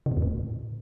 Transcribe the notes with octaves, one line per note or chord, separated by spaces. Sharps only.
C#3
A#2
E2
A2